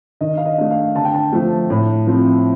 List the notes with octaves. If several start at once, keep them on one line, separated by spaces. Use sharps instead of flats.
D#3 D#5
F5
D#5
A3 D4
F5
D3 A5
G5
A5
F3 A3
A2
F3 C4